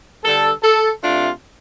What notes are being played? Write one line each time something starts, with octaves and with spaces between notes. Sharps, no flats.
G2 D3 G3 A4
A4
C3 A3 D4 F4